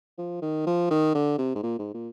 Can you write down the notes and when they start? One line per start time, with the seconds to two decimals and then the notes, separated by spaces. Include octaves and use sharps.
0.18 F3
0.42 D#3
0.66 F3
0.90 D#3
1.15 D3
1.38 C3
1.55 G#2
1.63 A#2
1.79 G#2
1.94 A#2